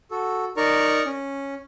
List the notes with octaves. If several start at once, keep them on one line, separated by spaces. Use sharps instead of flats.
F#4 A4
D#4 A#4 D5 A#5 C#6
C#4